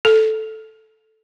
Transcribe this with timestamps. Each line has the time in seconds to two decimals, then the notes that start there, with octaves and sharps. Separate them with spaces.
0.05 A4